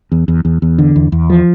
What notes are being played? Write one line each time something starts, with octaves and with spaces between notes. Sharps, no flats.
E2
E2
E2
E2
D3
E2
E2
F3